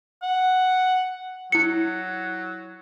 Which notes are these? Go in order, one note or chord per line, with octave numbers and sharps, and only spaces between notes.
F#5
F#3 E4 C#7